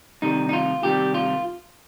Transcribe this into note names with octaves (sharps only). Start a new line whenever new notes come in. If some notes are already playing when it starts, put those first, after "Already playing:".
C3 D#3 G3 D#4
D#4
F4
C3 D#3 G3 G4
F4